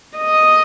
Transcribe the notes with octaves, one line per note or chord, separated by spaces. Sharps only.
D#5